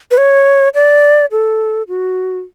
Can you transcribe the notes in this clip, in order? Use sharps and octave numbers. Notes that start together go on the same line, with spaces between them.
B4
C#5
D5
A4
F#4